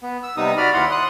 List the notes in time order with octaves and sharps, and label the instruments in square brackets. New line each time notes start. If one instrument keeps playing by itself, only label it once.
[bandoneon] B3
E6
C3 G3 B3 D#4 D#6
F#4 D5 B5 F6
D#2 E4 F#5 C6
C6 D#6 F#6